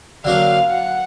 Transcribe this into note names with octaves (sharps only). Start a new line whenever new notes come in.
D3 F#3 A#3 D4 F5
F#5